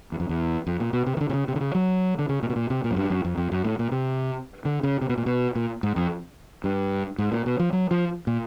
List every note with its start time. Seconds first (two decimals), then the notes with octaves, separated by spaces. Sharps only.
0.12 E2
0.20 F2
0.29 E2
0.67 F2
0.80 A#2
0.93 B2
1.06 C3
1.17 D#3
1.21 D3
1.30 C3
1.33 C#3
1.48 C3
1.56 D3
1.61 C#3
1.75 F#3
2.19 D3
2.29 C#3
2.43 A#2
2.50 B2
2.56 A#2
2.70 C3
2.84 A#2
2.91 F#2
2.96 G2
3.10 F#2
3.25 F2
3.37 F2
3.52 F#2
3.64 A2
3.79 A#2
3.92 C3
4.65 D3
4.83 C#3
5.01 C3
5.09 B2
5.18 A#2
5.26 B2
5.55 A#2
5.83 G#2
5.96 F2
6.64 G2
7.18 G#2
7.32 A#2
7.46 B2
7.59 F3
7.73 F#3
7.91 F3
8.27 A#2